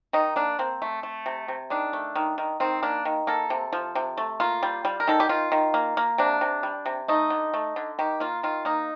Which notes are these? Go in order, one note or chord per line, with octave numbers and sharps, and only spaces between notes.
D#3 D#4
A#3 D4
A#3 C4
A3
A3
C3
C3
D#3 D4
A3
D#3
D#3
D#3 C4
A#3 D4
D#3
A#3 A4
C3
F3
C3
A3
A#3 F4
G3
G3
A#4
D#3 A4
G4
D#3 F4
D#3
A#3
A#3
C3 D4
C3
G3
C3
A3 D#4
D3
A3
D3
D#3 G4
A#3 F4
D#3 F4
A#3 D#4